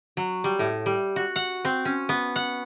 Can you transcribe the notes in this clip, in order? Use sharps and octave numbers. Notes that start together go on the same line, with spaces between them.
F#3
G3
A2
G3
F#4
F#5
C4
C#4
B3
F#5